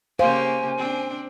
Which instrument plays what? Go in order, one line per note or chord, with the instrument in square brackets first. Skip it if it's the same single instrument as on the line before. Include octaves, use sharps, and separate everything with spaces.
[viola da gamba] C#3 A#3 G4 [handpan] C5 [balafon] F5 [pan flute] G#5
[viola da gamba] C4 D4